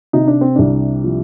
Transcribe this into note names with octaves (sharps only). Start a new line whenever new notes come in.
C3 D#4
D4
C4
C2 D4
F3